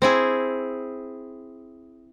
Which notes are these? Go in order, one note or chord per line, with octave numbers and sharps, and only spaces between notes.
C4 E4 G#4